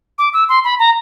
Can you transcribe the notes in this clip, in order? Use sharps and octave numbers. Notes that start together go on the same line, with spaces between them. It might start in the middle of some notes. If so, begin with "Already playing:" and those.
D6
E6
C6
B5
A#5